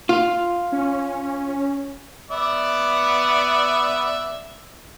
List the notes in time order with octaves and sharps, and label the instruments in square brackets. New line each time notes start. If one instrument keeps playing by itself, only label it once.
[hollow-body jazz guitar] F4
[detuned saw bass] C#4
[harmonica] B3 D5 E5